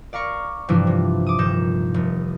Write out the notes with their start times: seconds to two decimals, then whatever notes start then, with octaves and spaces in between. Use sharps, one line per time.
0.13 D5 F5 A#5 C#6
0.68 G2 C3 E3 F3 D4 E4
0.87 C3
1.26 D6 D#6
1.39 D#1 G2 D#4 G6 E7
1.94 F1